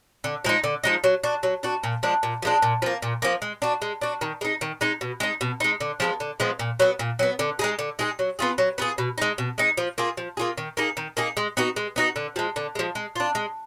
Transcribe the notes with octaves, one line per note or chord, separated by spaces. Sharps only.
D3
F3 G#3 D#4
D3
F3 G#3 D#4
F#3
D4 F#4
F#3
D4 F#4
A#2
F3 G#3 D4
A#2
F3 G#3 D4
A#2
F3 A#3
A#2
F3 A#3
G#3
D4 F#4
G#3
D4 F#4
D#3
G#3 D#4
D#3
G#3 D#4
B2
G#3 D#4
B2
G#3 D#4
D3
F3 G#3 B3
D3
F3 G#3 B3
A#2
F#3 B3
A#2
F#3 B3
D3
G#3 D#4 G#4
D3
G#3 D#4 G#4
F#3
B3 F4 G#4
F#3
B3 F4 G#4
B2
G#3 D#4
B2
G#3 D#4
F3
A#3 F4 G#4
F3
A#3 F4 G#4
D#3
A#3 D#4 G#4
D#3
A#3 D#4 G#4
G#3
B3 D#4 F#4
G#3
B3 D#4 F#4
D3
F3 G#3
D3
F3 G#3
G#3
D4 F4
G#3